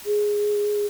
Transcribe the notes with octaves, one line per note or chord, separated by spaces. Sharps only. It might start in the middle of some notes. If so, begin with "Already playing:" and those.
G#4